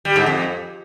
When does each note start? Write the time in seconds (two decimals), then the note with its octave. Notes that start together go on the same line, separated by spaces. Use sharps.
0.05 G3
0.16 G#2
0.26 F2